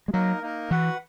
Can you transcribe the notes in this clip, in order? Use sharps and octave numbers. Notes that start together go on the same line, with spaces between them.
G#3
F#3 A#3 D#4 A#4
A#3 D#4 A#4
E3 F#4 B4 F#5